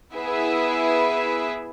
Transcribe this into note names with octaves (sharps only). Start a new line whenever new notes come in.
B3 E4 G#4 B4 E5